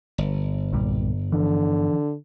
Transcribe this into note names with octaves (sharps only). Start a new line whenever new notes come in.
G1
B1 A#2 G3
D3 E3 F3